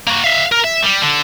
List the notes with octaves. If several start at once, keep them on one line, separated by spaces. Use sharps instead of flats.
A#3 F#4
E5 F5
A#4
E5
G3
D3